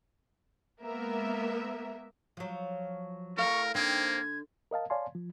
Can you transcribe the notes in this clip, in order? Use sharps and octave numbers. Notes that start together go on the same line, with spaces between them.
G#3 A#3 B3 A#4 E5
F3 F#3
A2 A4 A#4 F5 C#6
D3 A#3 C4 D#4 G#6
A#4 D#5 F5 A5
C#5 D5 F5 G#5 A5 C6
F3